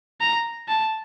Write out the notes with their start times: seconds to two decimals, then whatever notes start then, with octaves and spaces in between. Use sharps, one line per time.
0.21 A#5
0.68 A5